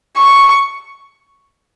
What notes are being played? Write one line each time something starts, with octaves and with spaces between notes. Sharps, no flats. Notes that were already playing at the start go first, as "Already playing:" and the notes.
C#6